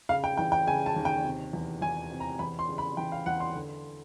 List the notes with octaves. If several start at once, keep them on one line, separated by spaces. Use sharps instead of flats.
C#3 F5
G5
E3 G5
G5
C#3 G#5
A5
D#2
G5
C3
E2
E2 G#5
C3
A#5
E2 B5
C6
C#3
B5
E3 G5
F5
E2 F#5
C6
D3